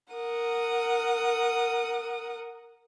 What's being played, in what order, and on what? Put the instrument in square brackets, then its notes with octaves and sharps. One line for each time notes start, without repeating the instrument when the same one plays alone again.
[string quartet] A#4 F#5 D#6